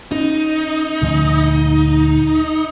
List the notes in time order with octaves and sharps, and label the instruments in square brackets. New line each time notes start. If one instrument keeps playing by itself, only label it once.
[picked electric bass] C#4 [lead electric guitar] D#4
[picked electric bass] D2 A#2 F3